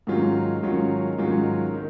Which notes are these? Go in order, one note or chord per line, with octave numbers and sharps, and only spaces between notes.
G#2 D#3 F#3 C#4 F4
G#2 D#3 F#3 C#4 F4
G#2 D#3 F#3 C#4 F4
D#3